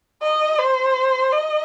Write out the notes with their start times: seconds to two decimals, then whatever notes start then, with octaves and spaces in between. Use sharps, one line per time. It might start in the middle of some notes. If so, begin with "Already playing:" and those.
0.22 D#5
0.59 C5
1.32 D#5